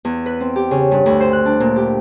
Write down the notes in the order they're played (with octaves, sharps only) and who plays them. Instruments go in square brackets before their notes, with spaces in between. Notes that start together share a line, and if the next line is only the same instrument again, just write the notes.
[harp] E2
B4
C4
G4
C#3
G2
D2
C5
F#6
D4
A#2
G4